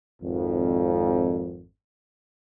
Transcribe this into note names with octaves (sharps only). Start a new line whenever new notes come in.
G#1 F2